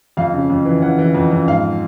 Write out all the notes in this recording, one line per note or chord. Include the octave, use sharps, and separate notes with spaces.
F2 F5
C#3
F2
E3
E3 F#5
E3
F2
F2
G#2 F5